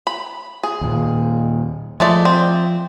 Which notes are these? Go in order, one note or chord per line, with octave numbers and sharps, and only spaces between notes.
B5
G#4
D#2 A#2
F3 G#3 A3 D5
C4